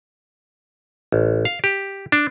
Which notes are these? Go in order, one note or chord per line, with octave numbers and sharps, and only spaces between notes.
A1
F5
G4
D4